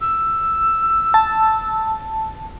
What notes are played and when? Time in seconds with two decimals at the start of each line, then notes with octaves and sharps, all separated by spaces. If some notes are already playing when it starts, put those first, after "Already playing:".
0.01 E6
1.14 A5